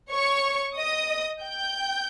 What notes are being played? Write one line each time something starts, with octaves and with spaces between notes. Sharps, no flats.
C#5 C#6
D#5 D#6
G5 G6